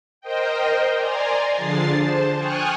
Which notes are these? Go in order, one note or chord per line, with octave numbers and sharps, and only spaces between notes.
A#4 C5 D#5 G5
D5 G#5 A#5 C6
D3 F3 D4 G#4 A6 C7
C5 A5
G5 G#5 C#6 D#6 F6 F#6